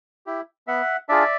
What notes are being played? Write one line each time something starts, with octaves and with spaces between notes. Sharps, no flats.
E4 G4
B3 E5 F#5
D4 F4 G#4 D5 E5